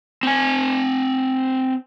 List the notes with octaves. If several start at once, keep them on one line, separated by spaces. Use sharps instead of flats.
C4 G#5